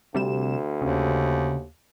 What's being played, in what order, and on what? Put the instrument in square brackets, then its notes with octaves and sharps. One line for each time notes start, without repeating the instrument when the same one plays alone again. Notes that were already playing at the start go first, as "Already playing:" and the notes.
[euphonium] D2 [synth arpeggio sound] C3 G3 E7
[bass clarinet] D#2 [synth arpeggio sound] C#3